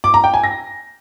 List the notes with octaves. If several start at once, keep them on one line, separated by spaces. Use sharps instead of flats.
D6
A#5
G5
G#5
A#6